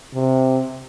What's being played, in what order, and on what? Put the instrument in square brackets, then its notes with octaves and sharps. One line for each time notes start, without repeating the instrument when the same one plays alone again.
[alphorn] C3